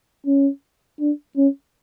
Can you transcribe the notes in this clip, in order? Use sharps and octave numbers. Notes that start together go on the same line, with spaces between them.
C#4
D4
C#4